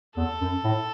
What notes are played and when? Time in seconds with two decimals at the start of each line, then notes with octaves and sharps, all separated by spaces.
0.17 E2 A4
0.41 F#2
0.64 A2